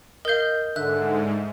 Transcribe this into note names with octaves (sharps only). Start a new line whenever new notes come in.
A#4 D#5 F5 G6
G#2 D3 E5 F#6